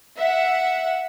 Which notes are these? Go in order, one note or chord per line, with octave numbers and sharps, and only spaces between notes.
E5 F#5